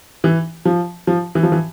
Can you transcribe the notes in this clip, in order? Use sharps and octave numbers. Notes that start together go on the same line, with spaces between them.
E3
F3
F3
E3
F3
E3